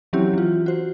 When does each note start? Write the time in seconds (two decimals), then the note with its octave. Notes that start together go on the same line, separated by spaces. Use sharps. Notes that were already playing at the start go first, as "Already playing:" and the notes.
0.13 E3 F#3 C4 C#4 E4 G4
0.33 E3 F4
0.66 F#4 C5